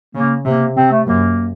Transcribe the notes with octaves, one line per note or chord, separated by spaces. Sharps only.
C#3 A#3
C3 A#3
C3 C4
A3
F#2 A#3